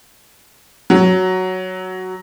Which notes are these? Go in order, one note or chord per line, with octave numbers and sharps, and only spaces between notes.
F#3